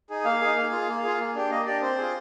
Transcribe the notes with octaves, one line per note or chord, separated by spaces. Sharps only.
D#4 G#4
A#3 F5
D#4 G#4
A#3
F4 G#4
A#3
F4 G#4
A#3
D4 G4
A#3 D#5
D4 G4 D5
C4 C5
F4 G#4